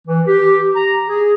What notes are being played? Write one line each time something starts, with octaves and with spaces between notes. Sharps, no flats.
E3
G4
A#5
G#4